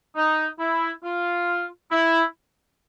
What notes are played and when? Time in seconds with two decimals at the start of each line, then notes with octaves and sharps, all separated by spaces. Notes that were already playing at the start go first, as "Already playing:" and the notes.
0.16 D#4
0.60 E4
1.04 F4
1.92 E4